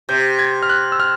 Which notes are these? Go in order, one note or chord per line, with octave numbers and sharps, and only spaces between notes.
C3 G6
G#6
F6
F#6
E6
F6